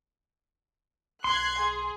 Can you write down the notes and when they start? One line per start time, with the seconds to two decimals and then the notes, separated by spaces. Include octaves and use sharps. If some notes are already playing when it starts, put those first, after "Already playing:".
1.24 B1 C6 F#6 G#6 C7
1.59 G#4